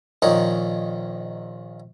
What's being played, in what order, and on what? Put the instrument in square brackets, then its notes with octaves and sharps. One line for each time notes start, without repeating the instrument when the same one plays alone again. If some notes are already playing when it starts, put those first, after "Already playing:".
[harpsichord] A#1 A#2 D#3 D#4 C#5 C#6